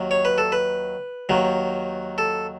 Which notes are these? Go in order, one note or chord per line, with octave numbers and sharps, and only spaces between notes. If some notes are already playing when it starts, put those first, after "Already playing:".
Already playing: D#2 D#3 F#3
C#5
B4
A4
B4
D#2 D#3 F#3
A4